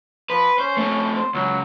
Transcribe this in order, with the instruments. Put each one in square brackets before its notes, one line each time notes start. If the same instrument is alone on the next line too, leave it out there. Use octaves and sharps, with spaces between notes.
[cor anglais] F3 [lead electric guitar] B4
[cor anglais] C#4 [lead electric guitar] C5
[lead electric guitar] A3 C4
[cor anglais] C5
[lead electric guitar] C#2 [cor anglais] F#3